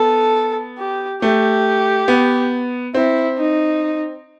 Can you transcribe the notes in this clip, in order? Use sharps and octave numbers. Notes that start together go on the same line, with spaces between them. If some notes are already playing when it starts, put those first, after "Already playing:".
Already playing: B3 A4
G4
A3 G4
B3
C4 E4
D#4